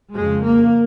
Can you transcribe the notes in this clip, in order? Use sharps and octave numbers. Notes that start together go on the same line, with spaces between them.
F2 C#3 G#3
A#3